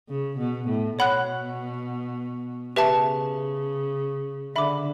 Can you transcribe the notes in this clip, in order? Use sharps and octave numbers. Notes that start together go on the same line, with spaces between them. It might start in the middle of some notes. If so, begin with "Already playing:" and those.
C#3
B2
A2
B2 C#5 F#5 B5 F#6
C#3 G4 B4 E5 A5
D3 E5 B5 D6